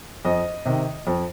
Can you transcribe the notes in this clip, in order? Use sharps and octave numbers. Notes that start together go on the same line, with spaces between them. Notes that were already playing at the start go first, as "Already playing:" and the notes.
F2 D#5
C3 D#3
F2